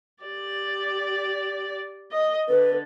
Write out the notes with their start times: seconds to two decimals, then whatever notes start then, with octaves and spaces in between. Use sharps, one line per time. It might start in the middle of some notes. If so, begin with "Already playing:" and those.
0.24 G4 D5
2.12 D#5
2.49 D3 A4 B4